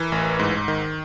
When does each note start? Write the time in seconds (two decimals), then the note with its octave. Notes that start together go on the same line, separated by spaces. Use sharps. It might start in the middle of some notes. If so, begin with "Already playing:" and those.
Already playing: E3 A#4
0.12 A1
0.40 G#2
0.68 D#3